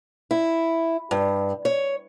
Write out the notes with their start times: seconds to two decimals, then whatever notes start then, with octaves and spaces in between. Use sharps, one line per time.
0.31 E4
1.11 G2
1.65 C#5